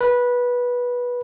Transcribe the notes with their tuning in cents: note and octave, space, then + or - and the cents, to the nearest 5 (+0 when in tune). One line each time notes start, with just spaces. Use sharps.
B4 -15